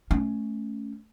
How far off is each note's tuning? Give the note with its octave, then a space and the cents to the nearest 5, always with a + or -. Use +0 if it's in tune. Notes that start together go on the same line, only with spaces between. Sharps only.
A3 -10 C#4 +0